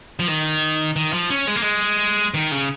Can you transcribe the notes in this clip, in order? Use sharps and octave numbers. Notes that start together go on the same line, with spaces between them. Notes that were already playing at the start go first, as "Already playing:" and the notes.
F3
D#3
D#3
F3
C#4
G#3
A#3
G#3
D#3
C#3